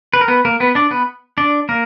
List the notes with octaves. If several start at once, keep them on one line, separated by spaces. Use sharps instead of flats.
B4
A#4
B3 B4
A#3 A#4
B3 B4
D4 D5
B3 B4
D4 D5
A#3 A#4